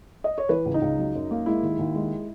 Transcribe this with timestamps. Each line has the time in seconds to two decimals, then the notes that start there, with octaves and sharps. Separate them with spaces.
0.24 D#5
0.38 C#5
0.49 E3 B4
0.65 C#2
0.74 D#4
0.82 C#2
0.99 F#3
1.15 F#2
1.31 A#3
1.46 G#3 E4
1.63 D#2
1.79 D#2
1.95 G#3